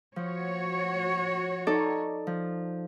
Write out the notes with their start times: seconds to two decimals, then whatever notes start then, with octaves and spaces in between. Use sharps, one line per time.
0.16 F3 F#4 C#5
1.67 D#4 A4 D5
2.27 F3